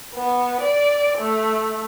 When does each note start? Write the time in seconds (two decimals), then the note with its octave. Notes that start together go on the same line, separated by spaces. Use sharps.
0.15 B3
0.61 D5
1.19 A3